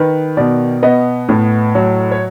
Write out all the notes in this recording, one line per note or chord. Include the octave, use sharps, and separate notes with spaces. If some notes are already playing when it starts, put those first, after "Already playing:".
Already playing: D#3 B4
B2 D5
B3 D#5
A2
F#3
C#5